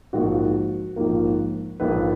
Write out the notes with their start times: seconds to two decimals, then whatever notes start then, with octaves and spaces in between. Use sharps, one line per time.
0.13 A#1 G#2 F3 A#3 F#4
0.96 A#1 G#2 F3 A#3
1.80 A#1 G#2 F3 A#3 B4